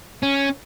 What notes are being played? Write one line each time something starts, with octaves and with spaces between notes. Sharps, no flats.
C#4